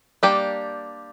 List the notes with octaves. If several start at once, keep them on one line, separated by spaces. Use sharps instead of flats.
G3 A#3 D4 G4